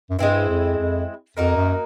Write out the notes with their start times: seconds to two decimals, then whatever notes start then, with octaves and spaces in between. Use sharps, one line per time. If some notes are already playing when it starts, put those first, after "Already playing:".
0.10 F#2
0.19 G2 G#3 C4 E4
0.48 F2
0.78 F2
1.37 F2 A#3 D#4 F#4 A#4
1.56 F#2